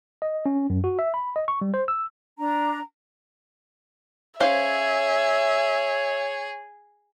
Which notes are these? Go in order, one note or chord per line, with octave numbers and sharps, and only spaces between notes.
D#5
C#4
F#2
F#4
E5
B5
D#5
C#6
G3
C5
E6
D4 A#5
C#4 G#4 C5 C#5 E5 F5